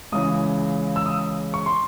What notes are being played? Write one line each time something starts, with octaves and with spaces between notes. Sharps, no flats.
C#2 C#3 E3 D#6
E6
D#6
C#6
C6